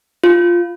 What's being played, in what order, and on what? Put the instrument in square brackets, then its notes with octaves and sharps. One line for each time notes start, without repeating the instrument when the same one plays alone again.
[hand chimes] F4